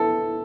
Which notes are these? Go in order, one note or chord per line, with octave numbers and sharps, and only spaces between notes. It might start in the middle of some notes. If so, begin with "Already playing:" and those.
Already playing: B3 E4 A4